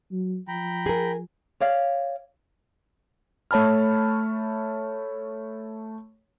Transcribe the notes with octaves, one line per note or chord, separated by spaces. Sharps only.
F#3
F3 G5 A#5 B5
G#4 A#4
C#5 D5 F5
A3 C#5 A5 B5 F6